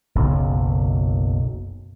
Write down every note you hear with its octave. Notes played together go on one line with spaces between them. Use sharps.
F#1 B1